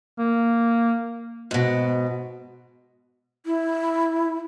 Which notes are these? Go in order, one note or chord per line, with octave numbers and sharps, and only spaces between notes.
A#3
G#2 B2
E4